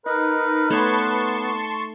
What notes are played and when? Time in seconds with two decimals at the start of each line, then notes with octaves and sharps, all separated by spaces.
0.06 D#4 A#4 B4
0.70 A3 B3 D#4 C#5 A5 C6 C#6